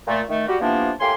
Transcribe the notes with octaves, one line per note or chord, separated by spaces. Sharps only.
A#2 A3
D#3 A3
G3 F#4 G4
C3 E3 F3 A#3 B3 D4
A2 A#3 G4 G#5 C6